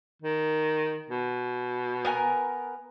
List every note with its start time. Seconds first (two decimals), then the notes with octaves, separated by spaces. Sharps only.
0.22 D#3
1.10 B2
2.05 B3 A#4 G#5